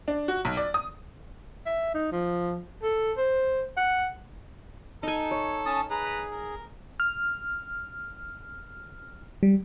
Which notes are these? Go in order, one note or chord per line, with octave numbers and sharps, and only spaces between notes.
D4
F#4
B1
D5
D#6
E5
D#4
F3
A4
C5
F#5
D#4 A4 G#5
C#5
C#4 A5 D#6
G#4 B4 A#5
A#4
F6
G3